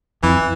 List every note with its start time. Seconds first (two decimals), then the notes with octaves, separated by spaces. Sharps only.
0.23 F2 E3